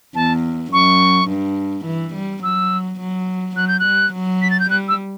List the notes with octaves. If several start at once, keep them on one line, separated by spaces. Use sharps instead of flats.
E2 A5
F#2 C#6
G2
E3
G3
F#3 E6
F#3
F#3 F#6
G6
F#6
G3
F#3
B6
A6
G6
G3 F#6
E6